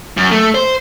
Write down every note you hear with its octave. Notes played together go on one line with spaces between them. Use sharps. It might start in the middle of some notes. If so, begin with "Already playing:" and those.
F#2
A3
C5